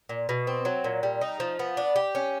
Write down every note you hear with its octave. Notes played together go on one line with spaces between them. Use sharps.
A#2
B2
C4
F#3
A#2
G3
D#4
F3
B3
D4
G4
C#4